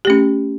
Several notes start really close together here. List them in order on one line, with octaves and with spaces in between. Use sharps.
G4 A3 C#4